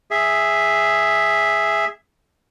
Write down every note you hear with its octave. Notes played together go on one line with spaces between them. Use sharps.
G#4 E5